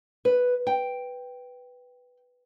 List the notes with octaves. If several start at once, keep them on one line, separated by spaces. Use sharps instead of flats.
B4
G5